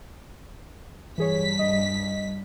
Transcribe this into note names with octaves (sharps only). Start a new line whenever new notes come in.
G2 E3 G#4 C#5 B6
D#5